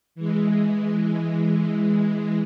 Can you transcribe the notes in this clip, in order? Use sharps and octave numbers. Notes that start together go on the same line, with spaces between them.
E3 G#3